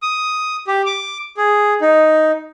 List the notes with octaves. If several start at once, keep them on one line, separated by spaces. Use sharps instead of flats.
D#6
G4
D6
G#4
D#4